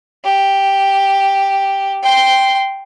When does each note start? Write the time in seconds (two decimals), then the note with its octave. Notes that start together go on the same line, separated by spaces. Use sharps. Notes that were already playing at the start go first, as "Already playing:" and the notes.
0.24 G4
2.03 G5 C6